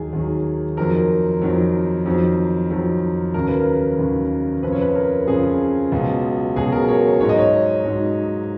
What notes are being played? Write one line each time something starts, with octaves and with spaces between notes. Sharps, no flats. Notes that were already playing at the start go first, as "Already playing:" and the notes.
Already playing: D#2 D#3 F#3 G#4
D#2 D#3 F#3
F2 D#3 F#3 A#4
F2 D#3 F#3
F2 D#3 F#3
F2 D#3 F#3
D#2 C#3 F#3 A#4
B4
A#4
D#2 C#3 F#3
F2 C#3 F3 B4
C#5
B4
A#4
F2 C#3 F3 G#4
C#2 B2 F#3
C#2 B2 F#3 G#4
A#4
C#5
G#2 F#3 C#5
D#5
C#5
G#2 F#3